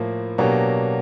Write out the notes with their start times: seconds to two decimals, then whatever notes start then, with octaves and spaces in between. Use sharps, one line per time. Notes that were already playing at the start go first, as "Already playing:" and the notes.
Already playing: A2 F3 A#3
0.38 B2 F#3 A#3 D4 G4